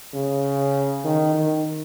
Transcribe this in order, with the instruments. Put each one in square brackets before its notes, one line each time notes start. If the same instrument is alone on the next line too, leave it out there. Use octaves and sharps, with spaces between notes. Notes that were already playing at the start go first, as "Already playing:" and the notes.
[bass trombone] C#3
D#3
D#3